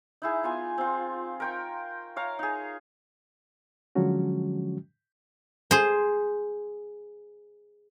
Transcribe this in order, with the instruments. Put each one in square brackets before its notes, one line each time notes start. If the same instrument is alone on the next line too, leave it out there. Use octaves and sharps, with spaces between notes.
[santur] D#4 E4 G#4
B3 F4 G#5
C4 F4
A#4 G5 C#6
C#5 F5 A#5
D#4 G#4
[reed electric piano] D3 F3 F#3 G#3 C#4 F#4
[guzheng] G#4 C5